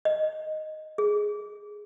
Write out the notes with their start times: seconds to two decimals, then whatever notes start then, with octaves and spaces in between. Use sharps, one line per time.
0.05 D#5
0.98 G#4